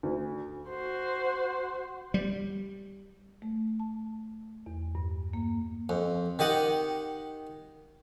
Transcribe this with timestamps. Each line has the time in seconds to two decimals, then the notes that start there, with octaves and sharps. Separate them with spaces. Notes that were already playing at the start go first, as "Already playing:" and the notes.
0.03 D2
0.69 F#4 C5
2.14 G3
3.42 A3
3.80 A5
4.66 E2
4.95 G2
5.33 A#3
5.89 F2
6.39 D#3 G4 D#5 F#5